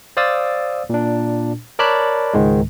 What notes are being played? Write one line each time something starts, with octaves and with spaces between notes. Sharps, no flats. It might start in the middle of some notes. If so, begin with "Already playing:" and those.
C5 D5 F5 D#6 E6 A6
A#2 D4
A#4 C#5 D5 A5 B5 F#6
C#2 G#2 D#3 G#3